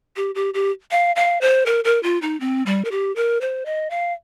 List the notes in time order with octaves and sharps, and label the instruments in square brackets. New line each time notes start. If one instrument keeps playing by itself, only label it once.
[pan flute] G4
G4
G4
F5
F5
C5
A#4
A#4
F4
D#4
C4
G3
A#4
G4
A#4
C5
D#5
F5